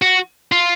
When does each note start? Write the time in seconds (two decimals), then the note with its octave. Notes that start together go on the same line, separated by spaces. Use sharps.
0.02 F#4
0.52 F4